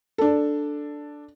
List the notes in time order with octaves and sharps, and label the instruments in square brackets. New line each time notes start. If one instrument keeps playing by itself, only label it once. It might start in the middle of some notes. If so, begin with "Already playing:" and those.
[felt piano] D4 A4